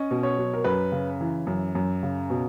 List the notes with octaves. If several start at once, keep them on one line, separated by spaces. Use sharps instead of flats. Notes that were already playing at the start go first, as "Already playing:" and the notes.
Already playing: C#4 D#5
B2
C#5
F#3
A#4
F#2 B4
C#3
E3
F#2
F#2
C#3
B2